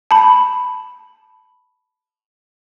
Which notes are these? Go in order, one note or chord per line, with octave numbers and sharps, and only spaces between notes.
A5 B5